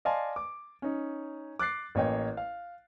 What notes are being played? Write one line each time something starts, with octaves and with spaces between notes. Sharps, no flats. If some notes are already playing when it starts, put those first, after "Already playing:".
D5 D#5 F5 G#5 A5 C6
D6
C#4 D#4
D6 F#6 A6 C7
A1 A#3 C#5 D#5 G5
F5